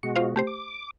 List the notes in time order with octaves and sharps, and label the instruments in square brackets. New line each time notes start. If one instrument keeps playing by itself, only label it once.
[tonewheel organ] B2 G#3 F#4 [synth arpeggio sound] C#7
[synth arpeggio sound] F4 C5 F5
[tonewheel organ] C3 [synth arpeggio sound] A3 G4 C5
[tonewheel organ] D6